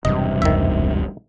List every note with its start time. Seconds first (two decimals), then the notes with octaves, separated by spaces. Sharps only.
0.05 E1 G2 C3 F#3 D4 D#5
0.42 F1 C#2 D#3 E5